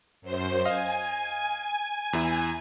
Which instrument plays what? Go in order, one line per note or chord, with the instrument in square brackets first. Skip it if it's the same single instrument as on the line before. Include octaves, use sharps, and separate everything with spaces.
[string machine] F#2 C5
[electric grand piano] D#5 F5 [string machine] G#5
[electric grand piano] E2 E4